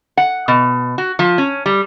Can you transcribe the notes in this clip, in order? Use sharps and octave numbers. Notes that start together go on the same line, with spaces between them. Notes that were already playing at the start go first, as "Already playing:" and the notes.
F#5
B2
F#4
F3
C#4
G3